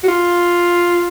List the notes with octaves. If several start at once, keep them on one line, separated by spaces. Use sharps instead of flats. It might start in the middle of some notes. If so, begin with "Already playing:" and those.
F#4
F4